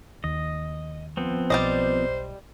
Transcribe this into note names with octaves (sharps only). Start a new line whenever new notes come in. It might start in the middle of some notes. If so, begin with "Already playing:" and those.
D#2 D#5
F3 B3 C4
B1 G3 C5 D5 D#5